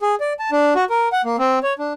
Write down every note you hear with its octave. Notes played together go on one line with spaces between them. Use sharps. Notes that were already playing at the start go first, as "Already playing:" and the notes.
G#4
D5
A5
D4
F#4
A#4
F#5
A#3
C4
C#5
D4